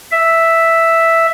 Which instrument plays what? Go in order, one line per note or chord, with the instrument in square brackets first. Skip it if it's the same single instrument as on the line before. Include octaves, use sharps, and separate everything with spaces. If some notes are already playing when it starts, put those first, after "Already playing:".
[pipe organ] E5